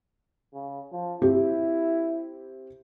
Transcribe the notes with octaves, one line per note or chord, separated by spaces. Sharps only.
C#3
F3
C4 E4 G4